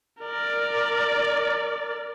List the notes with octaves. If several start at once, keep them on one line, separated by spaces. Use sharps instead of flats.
A#4 D5